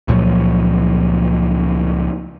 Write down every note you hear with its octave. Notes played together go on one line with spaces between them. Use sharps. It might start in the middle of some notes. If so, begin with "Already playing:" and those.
C#2 A#2 F3 F#3